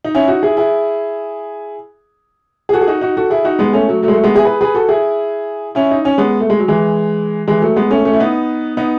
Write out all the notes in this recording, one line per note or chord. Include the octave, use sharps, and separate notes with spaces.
D#4
C#4 E4
D#4 F#4
E4 G#4
E4 G#4
G#4
F#4 A4
G#4
D#4 F#4
D#4 F#4
F#4 A4
E4 G#4
D#4 F#4
G#3 B3
A3 C#4
F#3 A3
F#3 A3
G#3
F#3 A3
G#3 B3
E4 G#4
G#4 B4
G#4 B4
F#4 A4
E4 G#4
C#4 E4
D#4
C#4
G#3 B3
A3
G#3
F#3
E3 G#3
E3 G#3
F#3 A3
G#3 B3
A3 C#4
A3 C#4
E4
B3 D#4
B3 D#4